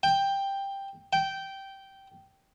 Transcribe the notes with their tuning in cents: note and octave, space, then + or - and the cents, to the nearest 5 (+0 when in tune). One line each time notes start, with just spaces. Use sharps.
G5 +10
G5 -10